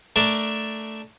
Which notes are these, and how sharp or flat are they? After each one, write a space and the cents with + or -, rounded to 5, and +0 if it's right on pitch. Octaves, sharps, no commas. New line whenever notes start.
A3 +0 D4 +0 A#4 +10